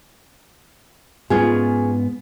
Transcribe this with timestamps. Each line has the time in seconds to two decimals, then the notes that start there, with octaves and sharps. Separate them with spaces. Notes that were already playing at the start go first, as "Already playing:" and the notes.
1.30 G#2 B3 C#4 F4 G#4